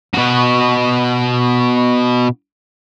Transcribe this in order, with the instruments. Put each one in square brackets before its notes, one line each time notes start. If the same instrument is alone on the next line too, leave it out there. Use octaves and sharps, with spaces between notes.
[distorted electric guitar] B2 F#4